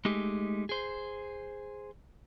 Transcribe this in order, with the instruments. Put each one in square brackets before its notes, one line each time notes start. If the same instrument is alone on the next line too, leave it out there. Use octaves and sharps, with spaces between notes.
[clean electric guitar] G#3 A3 D#4 G4 G#4
G#4 C5